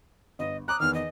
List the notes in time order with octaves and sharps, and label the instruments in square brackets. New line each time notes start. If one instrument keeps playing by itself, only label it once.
[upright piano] G1 [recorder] D#5
[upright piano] A#5 D6 D#6 [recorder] F#6
[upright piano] E2 D#3 [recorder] F6
[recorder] D#5